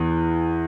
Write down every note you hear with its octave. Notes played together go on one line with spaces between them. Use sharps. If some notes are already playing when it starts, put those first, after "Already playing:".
Already playing: E2 E3